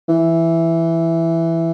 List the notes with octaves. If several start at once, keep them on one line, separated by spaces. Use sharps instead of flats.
E3